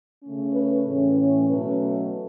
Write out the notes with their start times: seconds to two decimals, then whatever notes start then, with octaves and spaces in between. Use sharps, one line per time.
0.23 C#3 A3 C#4
0.54 B4
0.85 A2 E3 C#4
1.17 C#5
1.48 B2 F#3 A3 C#4 B4